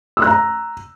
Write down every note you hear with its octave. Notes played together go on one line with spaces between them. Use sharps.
E6
F#6
A#5